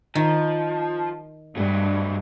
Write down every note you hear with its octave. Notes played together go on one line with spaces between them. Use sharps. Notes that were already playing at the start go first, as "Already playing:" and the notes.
D#3 F3
G2 F#3 A3